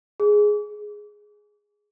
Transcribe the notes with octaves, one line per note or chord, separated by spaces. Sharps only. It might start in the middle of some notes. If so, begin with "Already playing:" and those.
G#4